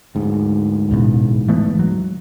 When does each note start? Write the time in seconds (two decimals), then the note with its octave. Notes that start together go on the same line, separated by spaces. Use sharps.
0.15 D2 G#2
0.91 E1 A1 E2
1.49 E3 A3 B3
1.79 F#3